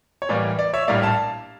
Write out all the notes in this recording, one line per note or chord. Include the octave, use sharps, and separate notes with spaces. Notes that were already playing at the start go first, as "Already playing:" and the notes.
C#5
A2 E3 G3 A#3 D5
D5
C#5 E5
A#1 A2 G3 A#3 D5 F5
F5 A5